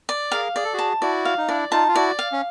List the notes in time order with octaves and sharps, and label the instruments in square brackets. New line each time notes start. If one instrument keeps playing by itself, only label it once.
[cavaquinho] D5
[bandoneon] G#4 A#4 [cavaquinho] F5
[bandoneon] G#4 [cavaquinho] D5
[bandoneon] A4
F#4 G#4
[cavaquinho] A5
[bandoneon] E4 F#4 [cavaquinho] D5
[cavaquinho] F5
[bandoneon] D#4
[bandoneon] D4 E4 [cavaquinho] D5
[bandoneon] D#4 F4 [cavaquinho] A5
[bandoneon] F4
[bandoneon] E4 F#4 [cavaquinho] D5
[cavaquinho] F5
[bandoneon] C#4